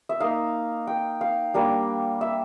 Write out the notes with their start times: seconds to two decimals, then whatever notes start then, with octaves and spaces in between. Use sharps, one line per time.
0.09 E5
0.20 A#3 D#4 F5
0.87 G5
1.21 F5
1.54 G3 A#3 D4
2.21 E5